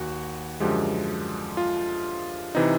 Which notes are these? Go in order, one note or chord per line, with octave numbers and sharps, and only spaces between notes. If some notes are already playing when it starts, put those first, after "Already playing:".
Already playing: D#2 F#4
F#2 D3 F3 G#3 G4
F4
C3 E3 D#4